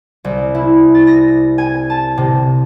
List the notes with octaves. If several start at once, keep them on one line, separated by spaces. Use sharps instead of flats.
C2
E4
A6
A#6
G#5
A5
C3